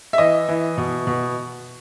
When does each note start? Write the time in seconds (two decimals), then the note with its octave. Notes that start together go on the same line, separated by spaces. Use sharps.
0.13 E5
0.18 E3 D#5
0.48 E3
0.77 B2
1.07 B2